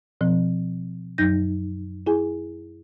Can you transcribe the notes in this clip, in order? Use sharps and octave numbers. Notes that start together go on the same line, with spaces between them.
B2 F3 C4
F#2 F#3 D#4 G6 A#6
E4 G#4 G#5